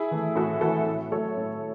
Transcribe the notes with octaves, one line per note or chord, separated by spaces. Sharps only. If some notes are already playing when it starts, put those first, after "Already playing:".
Already playing: E4 G#4
E3 A3
A2 F#4 A4
E3 A3 F#4 A4
A2
F#3 A3 A4 C#5
A2